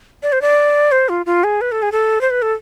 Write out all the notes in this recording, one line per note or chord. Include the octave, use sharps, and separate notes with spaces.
D5
C5
D5
C5
F4
F4
G#4
B4
A4
G#4
A4
C5
B4
A4